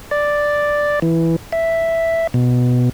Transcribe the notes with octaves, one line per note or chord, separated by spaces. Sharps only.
D5
E3
E5
B2